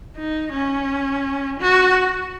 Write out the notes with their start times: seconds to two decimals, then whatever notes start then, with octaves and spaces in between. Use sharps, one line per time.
0.16 D#4
0.52 C#4
1.60 F#4